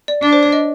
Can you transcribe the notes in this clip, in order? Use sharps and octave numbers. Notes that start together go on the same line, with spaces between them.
D5
D4 D5
C5
C#5
D#5